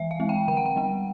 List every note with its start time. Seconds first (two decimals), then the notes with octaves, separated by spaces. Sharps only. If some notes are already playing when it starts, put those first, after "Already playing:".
Already playing: E3 E5
0.11 F5
0.20 G#3 C4
0.29 G5
0.48 D3 G5
0.57 F#5
0.66 G5
0.76 G3 B3